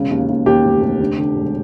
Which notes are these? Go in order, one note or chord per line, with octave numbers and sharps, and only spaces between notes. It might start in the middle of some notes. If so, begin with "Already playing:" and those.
Already playing: E1 C#3
D#2
D#2
D#2 G4
F1
F1
D3
D3
E1